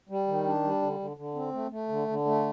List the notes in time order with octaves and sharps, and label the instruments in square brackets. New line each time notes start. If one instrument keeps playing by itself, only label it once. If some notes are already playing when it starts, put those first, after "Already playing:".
[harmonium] G3
D#3
D4
G3
D3
D3
D3
C4
A3
A3
D3
D3
A3